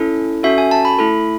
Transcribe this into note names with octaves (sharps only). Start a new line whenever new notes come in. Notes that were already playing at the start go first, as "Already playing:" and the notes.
Already playing: C#4 E4 A4
C#4 F#4 A4 E5
G#5
A5
B5
A3 E4 A4 B5